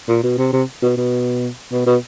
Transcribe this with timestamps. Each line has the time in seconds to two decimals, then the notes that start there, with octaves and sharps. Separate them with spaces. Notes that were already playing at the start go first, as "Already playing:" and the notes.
0.08 A#2
0.23 B2
0.38 C3
0.53 C3
0.82 B2
0.97 B2
1.72 B2
1.86 B2